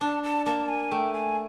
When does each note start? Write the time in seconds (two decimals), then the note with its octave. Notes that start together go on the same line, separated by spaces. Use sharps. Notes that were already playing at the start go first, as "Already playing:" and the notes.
0.01 D4 A5
0.23 A5
0.46 A#3 A5
0.68 G#5
0.91 A3 G5
1.13 G#5